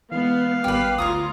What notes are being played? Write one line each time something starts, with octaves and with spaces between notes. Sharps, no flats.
E3 G#3 B3 F5
G#1 G3 G4 B4 D6
D2 F4 C#5 A#5 D#6